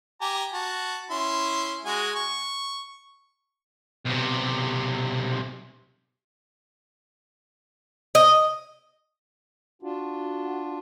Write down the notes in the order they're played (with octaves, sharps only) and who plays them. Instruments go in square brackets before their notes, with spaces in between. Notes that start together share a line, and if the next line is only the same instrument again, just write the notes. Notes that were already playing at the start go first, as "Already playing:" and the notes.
[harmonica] G4 G#5 A#5
F#4 A5
C#4 E4 C6
G#3 F#4 G#5
C#6
[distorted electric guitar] B1 C3
[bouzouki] D#5
[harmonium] D4 F4 [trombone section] F#4